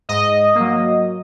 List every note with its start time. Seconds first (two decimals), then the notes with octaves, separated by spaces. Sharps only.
0.09 G#2 D#5
0.55 F#3 A#3